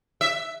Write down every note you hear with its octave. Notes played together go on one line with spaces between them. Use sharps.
E5